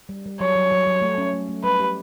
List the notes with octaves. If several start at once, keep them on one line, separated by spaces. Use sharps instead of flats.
G3
G3
F#3 C#5
F#3
F#3
F#3
A3
C#4
A3
A3
G3 B4
G4